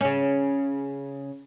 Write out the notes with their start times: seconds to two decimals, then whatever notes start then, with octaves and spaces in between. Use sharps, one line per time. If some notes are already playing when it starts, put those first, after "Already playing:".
0.01 C#3 C#4